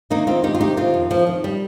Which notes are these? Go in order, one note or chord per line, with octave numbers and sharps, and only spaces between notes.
D#3 A#3 D#4
D#3 C4 F4
D#3 D#4 G4
F4
C3 D#4 G4
D#3 C4 F4
F2
F2 F3
D#3
G3